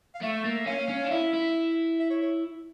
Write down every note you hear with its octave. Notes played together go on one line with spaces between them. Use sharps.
F5
A3 E5
A#3
C#4 F5
C#4
D4
E4 E5
E4
E5
C#5
C#5